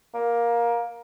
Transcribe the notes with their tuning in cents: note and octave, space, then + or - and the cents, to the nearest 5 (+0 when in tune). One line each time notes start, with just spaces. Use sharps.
A#3 +15